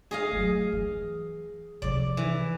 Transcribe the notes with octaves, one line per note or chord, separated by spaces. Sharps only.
G#4 D#5 F5
F#3 A3
E3
C3 F3 D5
E3